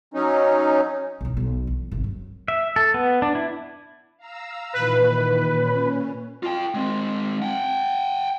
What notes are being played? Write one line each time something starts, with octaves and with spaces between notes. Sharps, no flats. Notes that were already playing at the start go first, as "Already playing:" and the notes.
F#3 C#4 D#4
B1 E3
B1 B2
E3
G#1 C3
F#2
E5
A4
B3
D4
E4
F5 A#5 E6
A#2 D#3 E3 B4
A#2 C#4
F4 G5
G#3 C4
F#5 G5